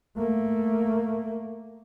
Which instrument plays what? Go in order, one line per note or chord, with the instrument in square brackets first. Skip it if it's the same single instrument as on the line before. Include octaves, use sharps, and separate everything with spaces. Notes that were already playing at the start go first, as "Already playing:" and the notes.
[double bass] A3 A#3